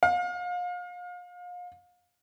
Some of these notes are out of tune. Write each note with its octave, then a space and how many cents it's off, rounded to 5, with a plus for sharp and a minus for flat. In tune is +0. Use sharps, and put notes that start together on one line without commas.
F5 +35